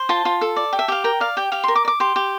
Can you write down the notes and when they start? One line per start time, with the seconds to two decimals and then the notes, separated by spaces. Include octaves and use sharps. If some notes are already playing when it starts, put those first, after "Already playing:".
Already playing: C5
0.09 F4 A5
0.25 F4
0.41 A4
0.56 D5
0.73 G4
0.79 E5
0.88 G4 F5
1.04 A#4 G5
1.20 D5 F5
1.37 G4 G5
1.52 G4 F5
1.64 A#4 C6
1.75 D6
1.85 D5
1.88 D6
2.00 G4 C6
2.16 G4